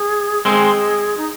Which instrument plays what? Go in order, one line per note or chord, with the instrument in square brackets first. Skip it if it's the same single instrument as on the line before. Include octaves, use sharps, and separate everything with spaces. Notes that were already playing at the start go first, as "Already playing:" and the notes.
Already playing: [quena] G#4
[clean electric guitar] G#3 C4 [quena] A#4
[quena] G#4
D#4